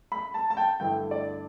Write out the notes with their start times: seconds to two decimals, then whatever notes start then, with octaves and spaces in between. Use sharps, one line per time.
0.12 B5
0.34 A5
0.50 A5
0.57 G5
0.80 G2 D3 A3 E4 G5
1.11 D5